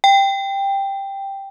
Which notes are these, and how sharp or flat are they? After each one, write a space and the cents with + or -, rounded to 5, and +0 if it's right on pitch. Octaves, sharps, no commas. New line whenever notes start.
G5 +5